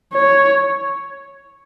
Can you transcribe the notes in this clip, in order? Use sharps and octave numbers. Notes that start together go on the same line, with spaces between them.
C#5